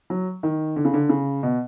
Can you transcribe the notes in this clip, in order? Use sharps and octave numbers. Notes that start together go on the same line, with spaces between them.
F#3
D#3
D3
C#3
D3
C#3
B2